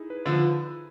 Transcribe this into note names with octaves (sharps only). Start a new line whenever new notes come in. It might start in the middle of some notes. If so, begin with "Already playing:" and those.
Already playing: D#4 E4 G#4
B4
D3 F3
B4